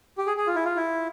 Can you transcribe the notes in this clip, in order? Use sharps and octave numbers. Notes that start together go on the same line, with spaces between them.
G4
G#4
G#4
F4
E4
F4
E4